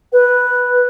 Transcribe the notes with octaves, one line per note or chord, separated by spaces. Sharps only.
B4